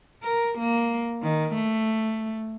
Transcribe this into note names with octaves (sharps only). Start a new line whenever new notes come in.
A#4
A#3
D#3
A3